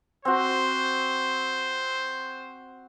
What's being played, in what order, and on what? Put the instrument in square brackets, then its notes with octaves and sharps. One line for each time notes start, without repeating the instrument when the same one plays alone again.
[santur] C4 F#4 [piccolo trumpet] C5